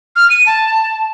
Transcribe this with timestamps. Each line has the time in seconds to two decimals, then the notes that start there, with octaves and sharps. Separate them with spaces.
0.16 F6
0.30 D#7
0.46 A5